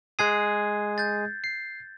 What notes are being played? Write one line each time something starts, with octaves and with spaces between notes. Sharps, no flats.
G#3 G#4 D#6 F#6 G#6 C7
G6 A6
C7